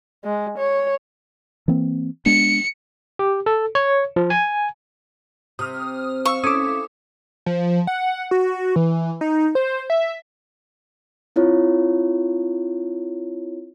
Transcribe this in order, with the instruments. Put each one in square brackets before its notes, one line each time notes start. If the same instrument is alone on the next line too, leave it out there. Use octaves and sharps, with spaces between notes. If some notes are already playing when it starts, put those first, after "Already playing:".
[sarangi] G#3
C#5
[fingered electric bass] E3 A#3 C4
[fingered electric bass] G#3 B3 D4 [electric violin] C#7
[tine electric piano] G4
A4
C#5
F3
G#5
[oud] C3 [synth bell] D#6 F6
[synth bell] F5 E6 [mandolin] C#6
[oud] A3 [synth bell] C#4 E4 [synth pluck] D6 D#6
[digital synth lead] F3
F#5
F#4
E3
D#4
C5
E5
[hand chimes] C4 E4 F4 C#5